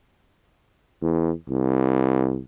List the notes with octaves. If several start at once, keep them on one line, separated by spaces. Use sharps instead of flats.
E2
C2